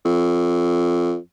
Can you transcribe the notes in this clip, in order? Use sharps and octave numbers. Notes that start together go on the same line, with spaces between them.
F2